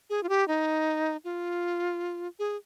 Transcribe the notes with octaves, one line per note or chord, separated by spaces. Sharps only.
G#4
F4
G4
D#4
F4
G#4